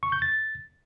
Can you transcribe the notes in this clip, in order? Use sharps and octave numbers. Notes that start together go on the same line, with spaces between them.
C#6
G6
A6